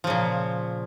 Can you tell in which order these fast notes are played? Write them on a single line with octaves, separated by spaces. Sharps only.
F3 C#3 A#2